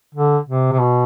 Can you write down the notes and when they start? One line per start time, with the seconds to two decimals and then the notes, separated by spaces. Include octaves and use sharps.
0.14 D3
0.49 C3
0.72 C3
0.81 B2